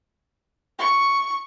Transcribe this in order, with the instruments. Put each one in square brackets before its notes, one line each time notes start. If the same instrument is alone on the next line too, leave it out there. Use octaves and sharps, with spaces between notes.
[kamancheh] C#6